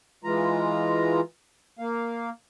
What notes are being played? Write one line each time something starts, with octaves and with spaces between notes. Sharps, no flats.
E3 G#3 F4 A#5
A#3 F5